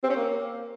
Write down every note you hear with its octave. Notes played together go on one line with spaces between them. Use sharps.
C4
C#4
A#3